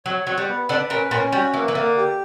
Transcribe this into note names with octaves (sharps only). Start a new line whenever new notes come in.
F#3 C#5
F#3 F#5
G3
B3
D3 D4 B4
A#2 A#3 C#4
A#2 A#3 C#4
G3 F#4
E3 A#3
E3
D3 A#3
G4